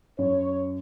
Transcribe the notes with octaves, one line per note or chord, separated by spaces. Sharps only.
F#2 C#5